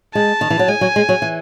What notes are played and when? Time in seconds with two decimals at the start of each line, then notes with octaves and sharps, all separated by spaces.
0.15 G#3 A5
0.41 D#3
0.50 E3
0.59 F#3
0.68 G#3 G#5
0.81 F#3
0.96 G#3
1.09 F#3
1.22 E3